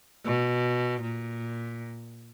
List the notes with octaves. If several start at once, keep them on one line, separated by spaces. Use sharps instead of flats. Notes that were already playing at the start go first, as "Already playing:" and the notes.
B2
A#2